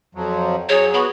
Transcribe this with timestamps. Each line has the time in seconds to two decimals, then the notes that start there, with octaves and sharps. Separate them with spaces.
0.15 F2 F3 F#3
0.69 F#3 G#4 C#5
0.94 B3 F#4 B5